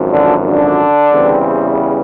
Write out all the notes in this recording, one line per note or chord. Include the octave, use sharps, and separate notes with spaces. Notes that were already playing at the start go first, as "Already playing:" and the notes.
Already playing: G#1 F#2 F3
D3 D4
D3 D4
E2 C#3 E3 G3 C4